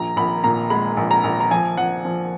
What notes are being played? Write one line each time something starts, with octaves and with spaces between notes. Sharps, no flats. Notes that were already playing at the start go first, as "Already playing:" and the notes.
Already playing: A#1 A#5
A#1 B5
A#2 A#5
G#3 B5
A#1
A#5
A#1
A#5
F3 G#5
F3 F#5
F3